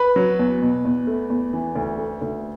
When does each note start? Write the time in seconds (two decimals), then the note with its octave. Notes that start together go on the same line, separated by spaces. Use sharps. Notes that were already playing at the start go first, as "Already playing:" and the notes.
Already playing: B4 B5
0.16 F#3
0.39 E2
0.62 B2
0.85 E2
1.07 A3
1.30 E2
1.53 E3
1.75 D2
1.98 A3
2.21 D2